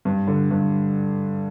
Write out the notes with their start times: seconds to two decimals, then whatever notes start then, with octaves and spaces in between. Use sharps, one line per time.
0.05 G2
0.27 D3
0.51 G2